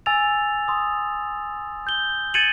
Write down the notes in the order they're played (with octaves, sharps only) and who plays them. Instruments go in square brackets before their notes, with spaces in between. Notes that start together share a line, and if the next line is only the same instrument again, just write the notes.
[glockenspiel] G#5 E6 A6 F7
C6 D#6
G6 G7
G#6 A6 C#7 D#7 E7 F#7